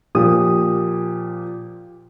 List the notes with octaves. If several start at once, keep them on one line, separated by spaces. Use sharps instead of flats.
A#2 F3 G4 D#6